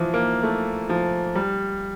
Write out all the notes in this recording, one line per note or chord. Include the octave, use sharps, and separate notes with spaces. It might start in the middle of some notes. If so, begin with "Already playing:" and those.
Already playing: E3 F3
A#3
A3
F3
G3